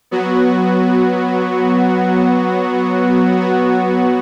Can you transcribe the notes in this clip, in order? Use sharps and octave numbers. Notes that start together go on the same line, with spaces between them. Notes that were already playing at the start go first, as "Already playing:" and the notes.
F#3 B3 F#4
F#3 B3 F#4